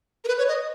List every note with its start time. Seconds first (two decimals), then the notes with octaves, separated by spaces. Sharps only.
0.24 A#4
0.28 B4
0.38 C#5
0.48 D#5